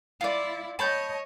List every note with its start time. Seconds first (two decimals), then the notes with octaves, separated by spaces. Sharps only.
0.21 E4 F4 D5
0.79 C#5 D#5 A5 B5 G6